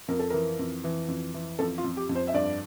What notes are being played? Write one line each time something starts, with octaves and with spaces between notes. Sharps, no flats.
F2 A#4
A4
E3 A#4
F2
E3
F2
E3
F2 A4
F4
F2
G4
F2
C5
E5
G2 D5